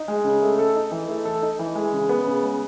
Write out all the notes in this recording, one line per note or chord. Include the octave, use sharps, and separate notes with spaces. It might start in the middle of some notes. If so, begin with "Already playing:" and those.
Already playing: D#4
G#3
C#3
A3
A4
D#4
E3
A3
A4
D#4
E3
G#3
C#3
B3
C#3
G#3